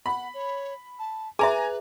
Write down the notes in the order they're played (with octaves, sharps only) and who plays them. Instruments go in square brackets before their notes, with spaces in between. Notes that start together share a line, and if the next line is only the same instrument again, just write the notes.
[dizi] F#5 [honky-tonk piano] B5
[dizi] C#5
A5
[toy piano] G#4 E5 [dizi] B4 [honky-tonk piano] G#5 A#5